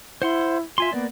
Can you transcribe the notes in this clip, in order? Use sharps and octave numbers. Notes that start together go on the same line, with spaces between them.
E4 C5 F#5 C6
F4 E5 G#5 C6
A#3 B3 D5